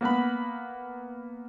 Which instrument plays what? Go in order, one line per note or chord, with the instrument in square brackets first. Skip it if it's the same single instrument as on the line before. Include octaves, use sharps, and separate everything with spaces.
[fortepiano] A#3 B3 B4 B5